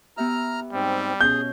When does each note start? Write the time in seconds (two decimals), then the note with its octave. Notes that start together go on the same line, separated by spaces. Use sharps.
0.17 B3 G4 E5 A#5 F6
0.73 G#2 G3 C4
1.21 B2 C#4 G#4 G6